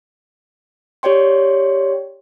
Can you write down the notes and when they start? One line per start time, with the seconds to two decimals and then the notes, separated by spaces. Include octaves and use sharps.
1.03 G4 C#5 D5 G5 C6